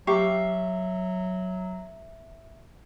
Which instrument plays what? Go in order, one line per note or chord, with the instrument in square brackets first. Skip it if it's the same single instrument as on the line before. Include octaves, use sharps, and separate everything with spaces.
[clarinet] F#3 [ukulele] G4 [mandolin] E5 F5 C#6